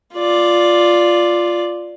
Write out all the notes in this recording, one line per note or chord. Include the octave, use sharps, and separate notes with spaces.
F4 D5